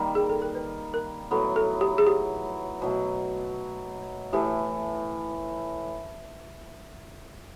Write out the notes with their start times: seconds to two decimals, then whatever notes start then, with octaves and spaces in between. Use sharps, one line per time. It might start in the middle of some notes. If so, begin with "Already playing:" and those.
Already playing: D#3 G3 A#3
0.15 G#4
0.29 A4
0.42 A#4
0.55 B4
0.94 A#4
1.31 A2 F#3 B3 A4
1.56 A4
1.81 G4
1.98 G#4
2.06 G4
2.82 B2 F#3 A3
4.33 A2 E3 A3 G4